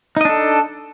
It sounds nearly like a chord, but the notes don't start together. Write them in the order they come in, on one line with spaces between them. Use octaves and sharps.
D#4 D#5 D4 A4